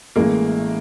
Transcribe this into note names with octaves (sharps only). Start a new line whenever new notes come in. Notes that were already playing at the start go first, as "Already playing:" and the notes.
A1 A2 E3 G#3 A#3